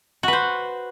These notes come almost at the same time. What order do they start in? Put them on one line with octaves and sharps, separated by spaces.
F#4 B4 C5